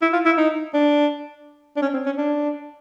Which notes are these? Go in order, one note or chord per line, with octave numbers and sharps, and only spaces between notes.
E4
F4
E4
D#4
D4
D4
C#4
C4
C#4
D4